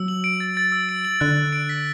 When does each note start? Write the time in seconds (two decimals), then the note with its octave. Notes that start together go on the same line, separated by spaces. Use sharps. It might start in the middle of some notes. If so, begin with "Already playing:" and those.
Already playing: F#3 E6
0.08 F#7
0.24 D7
0.40 A6
0.57 A6
0.72 E6
0.89 D7
1.05 F#7
1.20 D3 F#6
1.37 F#6
1.53 D7
1.69 B6